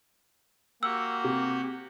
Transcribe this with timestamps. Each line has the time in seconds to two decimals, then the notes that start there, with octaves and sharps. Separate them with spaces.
0.83 A#3 F#4 G4 F#5 E6
1.24 C3